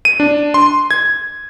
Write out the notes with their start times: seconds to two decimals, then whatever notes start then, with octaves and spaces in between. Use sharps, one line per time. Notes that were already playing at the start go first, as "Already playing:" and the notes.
0.05 D#7
0.20 D4
0.54 C6
0.91 G#6